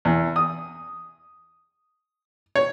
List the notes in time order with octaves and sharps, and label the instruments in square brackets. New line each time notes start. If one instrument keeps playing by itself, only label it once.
[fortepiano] E2
D#6
C#5